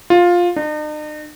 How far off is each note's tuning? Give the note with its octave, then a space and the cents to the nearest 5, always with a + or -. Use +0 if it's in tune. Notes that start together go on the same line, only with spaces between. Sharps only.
F4 +10
D#4 -45